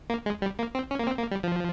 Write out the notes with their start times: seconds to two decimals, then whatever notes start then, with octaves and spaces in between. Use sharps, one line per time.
0.10 A#3
0.26 G#3
0.42 G3
0.59 A#3
0.75 C4
0.91 C#4
0.99 A#3
1.07 C4
1.19 A#3
1.31 G3
1.43 F3